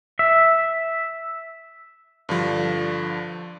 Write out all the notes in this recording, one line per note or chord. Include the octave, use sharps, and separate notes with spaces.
E5
G2 D3 F3